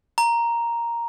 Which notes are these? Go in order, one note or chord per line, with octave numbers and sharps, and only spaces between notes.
A#5